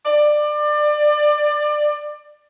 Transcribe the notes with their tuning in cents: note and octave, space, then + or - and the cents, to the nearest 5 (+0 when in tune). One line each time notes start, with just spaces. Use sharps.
D5 +25